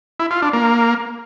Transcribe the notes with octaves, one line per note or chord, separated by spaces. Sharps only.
E4
F4
D4
A#3